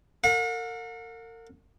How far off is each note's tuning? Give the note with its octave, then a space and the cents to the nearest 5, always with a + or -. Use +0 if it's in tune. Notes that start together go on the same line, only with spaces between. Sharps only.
A#4 -40 F#5 -45